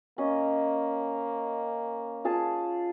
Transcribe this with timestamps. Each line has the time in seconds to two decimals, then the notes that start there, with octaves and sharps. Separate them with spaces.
0.18 A#3 C#4 D#5
2.25 F4 G#4 A5